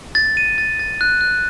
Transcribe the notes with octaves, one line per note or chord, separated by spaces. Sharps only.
A6
D#7
A6
A6
F#6
F#6